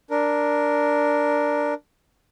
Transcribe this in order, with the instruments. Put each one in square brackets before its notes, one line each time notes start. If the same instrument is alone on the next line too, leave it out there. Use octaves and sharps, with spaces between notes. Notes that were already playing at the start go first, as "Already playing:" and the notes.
[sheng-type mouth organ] D4 A#4